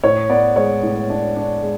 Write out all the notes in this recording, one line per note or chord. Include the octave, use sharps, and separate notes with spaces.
A2 C#5
B3 D5
G#3 C#5
A2
D4
D4
G#3